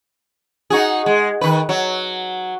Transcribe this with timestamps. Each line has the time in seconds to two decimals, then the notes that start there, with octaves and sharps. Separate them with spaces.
0.70 D#4 F#4 G#4
1.06 G#3
1.41 D#3 B4
1.69 F#3